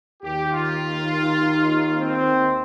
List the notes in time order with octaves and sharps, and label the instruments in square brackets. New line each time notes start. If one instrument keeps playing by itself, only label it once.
[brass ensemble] D#2 D#3 G4
F4
C4